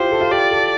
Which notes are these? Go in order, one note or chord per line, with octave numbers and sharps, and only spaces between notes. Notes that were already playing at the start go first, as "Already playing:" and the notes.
Already playing: E4 F4 G4 C5
A4
F4
G4 D5
A4